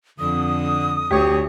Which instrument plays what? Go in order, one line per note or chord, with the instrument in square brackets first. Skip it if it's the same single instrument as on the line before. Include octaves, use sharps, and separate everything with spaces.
[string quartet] F2 [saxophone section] D3 [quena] D#6
[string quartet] D2 [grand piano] G4 [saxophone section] C#5